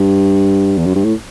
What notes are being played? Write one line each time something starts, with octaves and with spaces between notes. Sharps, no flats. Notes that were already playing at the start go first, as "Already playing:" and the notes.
Already playing: G2
E2
F#2
G2
A2